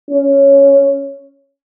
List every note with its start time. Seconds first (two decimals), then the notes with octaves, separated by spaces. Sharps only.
0.11 C#4